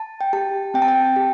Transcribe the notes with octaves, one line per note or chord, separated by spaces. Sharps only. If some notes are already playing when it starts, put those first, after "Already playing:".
Already playing: A5
G5
G4 A5
C4 G5
A5
G5
G4